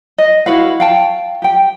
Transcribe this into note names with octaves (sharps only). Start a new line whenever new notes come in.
D#5
E4 F#4 B4 F5
F5 G5 A5
G4 G5